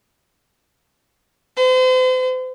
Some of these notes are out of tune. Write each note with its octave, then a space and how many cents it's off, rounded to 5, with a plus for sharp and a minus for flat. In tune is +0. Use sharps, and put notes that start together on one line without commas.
C5 -40